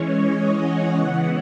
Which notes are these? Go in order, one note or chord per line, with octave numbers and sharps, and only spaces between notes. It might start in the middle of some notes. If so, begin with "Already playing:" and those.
Already playing: E3 G#3 C#4 C#5
D#5
F#5
C#3 E3 B3